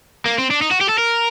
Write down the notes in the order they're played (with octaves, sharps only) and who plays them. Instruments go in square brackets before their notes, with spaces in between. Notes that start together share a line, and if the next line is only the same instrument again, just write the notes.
[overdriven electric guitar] A#3
C4
D4
D#4
F#4
G4
A4
A#4